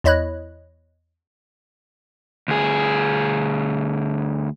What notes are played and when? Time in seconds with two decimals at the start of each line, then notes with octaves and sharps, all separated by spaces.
0.04 E2 E4 C#5 D#5 B5 F#6
2.48 D2 G#4